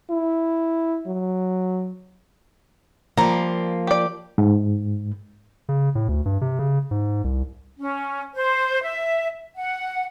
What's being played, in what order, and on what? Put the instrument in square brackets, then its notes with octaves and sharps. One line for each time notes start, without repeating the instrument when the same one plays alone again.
[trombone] E4
F#3
[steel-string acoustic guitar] F3 A#3 [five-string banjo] G3 A#5
[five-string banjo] G4 D5
[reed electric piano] G#2
[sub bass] C#3
A2
D2
G2
C3
C#3
G#2
C2
[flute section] C#4
C5
E5
F#5